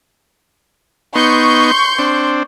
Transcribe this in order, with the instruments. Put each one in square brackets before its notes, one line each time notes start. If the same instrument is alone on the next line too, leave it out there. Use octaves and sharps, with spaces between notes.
[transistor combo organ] B3 D#4 [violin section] C6 C#6 G6
[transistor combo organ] C4 D4